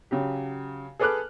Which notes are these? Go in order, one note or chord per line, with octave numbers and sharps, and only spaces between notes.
C#3 F#3 G4
G#4 A4 B4 D6 F6 F#6